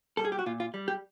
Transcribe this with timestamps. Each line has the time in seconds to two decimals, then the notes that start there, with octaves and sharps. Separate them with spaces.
0.17 G3 A4
0.25 G#4
0.32 G4
0.39 F#4
0.46 A#2 F4
0.60 F4
0.74 G3
0.88 G4